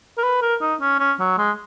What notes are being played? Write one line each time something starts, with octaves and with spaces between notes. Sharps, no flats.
A#4
B4
A#4
D#4
C#4
C#4
F#3
G#3